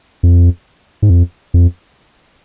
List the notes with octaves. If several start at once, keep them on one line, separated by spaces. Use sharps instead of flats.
F2
G#2
F2
F2